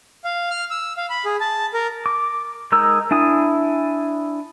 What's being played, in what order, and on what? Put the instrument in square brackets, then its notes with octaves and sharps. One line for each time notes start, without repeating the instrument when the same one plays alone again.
[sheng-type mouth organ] F5
F6
E6
F5
B5
G#4
A5
A#4
[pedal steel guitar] D6
G#3 D#4 A#4 E6
D4 E4 G#5 D#6